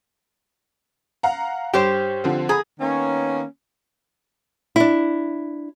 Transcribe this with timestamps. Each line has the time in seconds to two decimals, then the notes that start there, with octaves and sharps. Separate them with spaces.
1.23 F5 F#5 A#5
1.74 G2 G4 C5 C#5 E7
2.24 D3 F3 C4
2.49 G#4 A#5 B5
2.80 D#3 A#3 B3 C#4
4.76 D4 E4